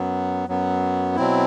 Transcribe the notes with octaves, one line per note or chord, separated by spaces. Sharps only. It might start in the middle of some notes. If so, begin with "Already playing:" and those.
Already playing: F#2 F#3 B3
F#2 F#3 B3
B2 F#3 C4 E4